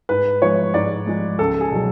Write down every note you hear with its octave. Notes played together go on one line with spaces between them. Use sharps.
G#2 B4
F3 G#3 C#5
G#2 D5
F3 G#3
C#2 A4
G#4
B2 F#3